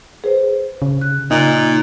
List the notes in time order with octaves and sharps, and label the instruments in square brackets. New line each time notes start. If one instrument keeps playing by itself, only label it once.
[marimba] G#4 B4 C5
[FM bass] C#3
[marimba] F#6
[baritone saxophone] A#2 [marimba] C#3 [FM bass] D#4